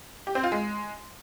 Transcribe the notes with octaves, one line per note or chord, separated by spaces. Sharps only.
G4
C4
F4
G#3